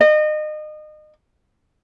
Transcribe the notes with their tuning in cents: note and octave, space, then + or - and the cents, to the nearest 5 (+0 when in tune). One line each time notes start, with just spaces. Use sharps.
D#5 -30